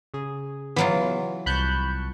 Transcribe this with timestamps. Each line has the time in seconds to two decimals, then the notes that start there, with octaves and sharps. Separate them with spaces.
0.14 C#3 G#4
0.76 E3 F#3 B3 F4
1.46 C2 A5 B5 C#6 F#6 G6